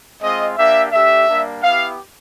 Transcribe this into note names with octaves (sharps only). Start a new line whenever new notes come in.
G#3 C4 F4 D#5
A#3 D4 G4 E5
A3 D4 G4 E5
G3 A#3 D4
B3 E4 G4 F5